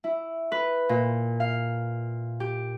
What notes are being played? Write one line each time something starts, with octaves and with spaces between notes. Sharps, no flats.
E4
B4
A#2
F5
G4